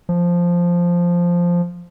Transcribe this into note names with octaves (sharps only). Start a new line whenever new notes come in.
F3